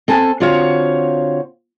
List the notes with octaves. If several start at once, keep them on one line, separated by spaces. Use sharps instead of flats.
C4 A4 G#5 A5
D3 C4 F4 F#4 C#5 F5